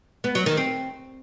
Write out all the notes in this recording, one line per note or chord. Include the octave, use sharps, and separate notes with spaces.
B3
F#3
D#3
C4